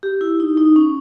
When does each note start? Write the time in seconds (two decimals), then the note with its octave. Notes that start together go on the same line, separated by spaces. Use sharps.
0.03 G4
0.21 E4
0.40 D#4
0.57 D#4
0.76 C#4